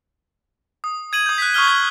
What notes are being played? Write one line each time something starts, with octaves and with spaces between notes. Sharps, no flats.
D#6
G#6 D#7 F#7
D#6 G6
F#6 B6
C#6 D#6 F6 G7
G#6